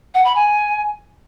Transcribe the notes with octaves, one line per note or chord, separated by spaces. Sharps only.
F#5
B5
G#5